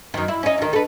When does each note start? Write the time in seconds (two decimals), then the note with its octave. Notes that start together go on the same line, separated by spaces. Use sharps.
0.14 F#2 D#3
0.28 E4
0.43 C#4 D#4
0.58 D2 D#3
0.73 A4 B4